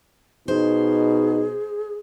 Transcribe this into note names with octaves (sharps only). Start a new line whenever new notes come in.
B2 D#4 G#4 C5